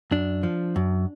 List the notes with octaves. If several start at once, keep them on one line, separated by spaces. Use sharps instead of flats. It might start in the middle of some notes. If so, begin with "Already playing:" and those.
F#2 D4
F3
F#2